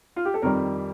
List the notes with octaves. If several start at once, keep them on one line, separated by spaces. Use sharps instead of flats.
F4
G4
A4
F2 D#3 G3 A#4